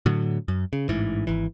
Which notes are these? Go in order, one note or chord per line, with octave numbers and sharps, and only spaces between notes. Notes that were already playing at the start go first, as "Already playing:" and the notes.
A2 D3 F#3
F#2
C#3
A1 G#2 E3
G#1 E3